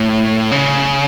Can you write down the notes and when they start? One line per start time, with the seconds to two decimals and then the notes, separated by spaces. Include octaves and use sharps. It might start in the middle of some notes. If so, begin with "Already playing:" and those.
Already playing: A2
0.51 C#3